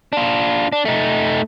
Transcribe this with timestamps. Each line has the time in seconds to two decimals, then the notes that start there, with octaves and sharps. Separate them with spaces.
0.13 D4 F4
0.72 D4
0.85 A3 D#4